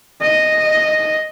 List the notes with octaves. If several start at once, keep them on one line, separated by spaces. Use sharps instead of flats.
D#5